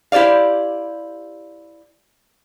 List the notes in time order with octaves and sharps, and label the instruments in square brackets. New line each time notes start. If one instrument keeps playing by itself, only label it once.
[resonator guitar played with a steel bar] E4 G4 C5 D5 F5